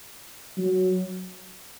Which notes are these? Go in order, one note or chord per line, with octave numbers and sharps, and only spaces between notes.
F#3